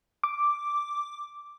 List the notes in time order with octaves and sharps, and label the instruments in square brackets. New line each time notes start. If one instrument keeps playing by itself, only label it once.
[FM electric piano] D6